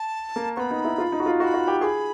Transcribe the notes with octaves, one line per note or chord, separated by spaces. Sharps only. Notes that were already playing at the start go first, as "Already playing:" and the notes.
Already playing: A5
A#3
B3 C#6
B5
D#4
E4
F4
D#4
F#4
F4
F#4 C#6
B5
F#4
G4
G#4 B5 C#6